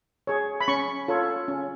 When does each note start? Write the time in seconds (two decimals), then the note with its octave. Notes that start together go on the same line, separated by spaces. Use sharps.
0.27 G#4 C#5
0.61 B5
0.68 C#4 C#6
1.08 F4 A4 C#5
1.48 C#4